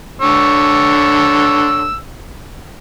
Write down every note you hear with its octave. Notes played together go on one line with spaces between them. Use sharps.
D3 C#5 E6